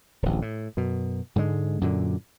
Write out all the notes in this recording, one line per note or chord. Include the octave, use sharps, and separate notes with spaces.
D1 A1
A2
F#2 B2
G#2 D3 F3 G#3
F#2 A#2 D3